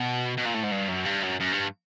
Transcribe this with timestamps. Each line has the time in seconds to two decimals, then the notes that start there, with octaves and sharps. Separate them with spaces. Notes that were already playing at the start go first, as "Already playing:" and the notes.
Already playing: B2
0.38 B2
0.46 A#2
0.55 A2
0.64 G#2
0.72 G2
0.88 F#2
1.05 G2
1.23 F#2
1.40 F#2
1.52 G2